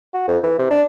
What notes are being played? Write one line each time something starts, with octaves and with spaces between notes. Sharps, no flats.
F#4
F2
E3
C3
D4